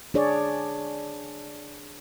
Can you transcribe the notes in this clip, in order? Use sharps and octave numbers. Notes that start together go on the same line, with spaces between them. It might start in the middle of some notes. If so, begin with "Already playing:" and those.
D4 G#4 C#5 D5